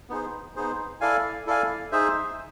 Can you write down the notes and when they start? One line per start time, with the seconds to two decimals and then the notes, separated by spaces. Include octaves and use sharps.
0.10 B3 D#4 G#4 C5
0.56 B3 D#4 G#4 C5
1.01 E4 A4 D5 F5 G#5
1.46 E4 A4 D5 F5 G#5
1.92 D#4 G#4 C5 E5